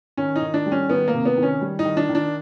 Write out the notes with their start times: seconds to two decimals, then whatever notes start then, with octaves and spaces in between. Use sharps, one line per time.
0.17 D#3 C#4
0.36 D#4
0.42 D#3
0.54 D4
0.66 G3
0.72 C#4
0.90 D#3 B3
1.08 A#3
1.13 C3
1.25 B3
1.37 D#3
1.43 C#4
1.61 G3
1.79 D#4
1.85 D#3
1.97 D4
2.09 D#3
2.15 D4